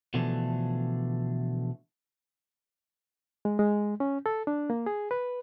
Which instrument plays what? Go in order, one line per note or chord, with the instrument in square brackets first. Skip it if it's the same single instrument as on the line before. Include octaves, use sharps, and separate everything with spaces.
[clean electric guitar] B2 D3 E3 F3 A3 D4
[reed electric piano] G#3
G#3
C#4
A4
D4
A#3
G#4
B4